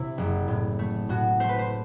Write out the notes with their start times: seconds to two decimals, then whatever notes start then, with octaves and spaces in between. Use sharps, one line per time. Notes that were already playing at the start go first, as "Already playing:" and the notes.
Already playing: C3 E4
0.18 F#1
0.48 A2
0.79 A3
1.09 A2 F#4
1.40 A3 C5
1.49 B4
1.59 C5